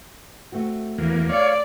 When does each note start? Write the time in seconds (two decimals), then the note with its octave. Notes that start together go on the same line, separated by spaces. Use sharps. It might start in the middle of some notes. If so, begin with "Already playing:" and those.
0.52 A3 C4 F#4
0.98 E2 A#3
1.29 C#5 D5 F5